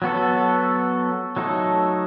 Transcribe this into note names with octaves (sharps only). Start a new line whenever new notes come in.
F#3 B3 F#4 A4
F#3 A3 D#4 A4